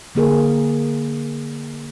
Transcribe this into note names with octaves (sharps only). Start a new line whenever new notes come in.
D3 A#3 G#4 A#4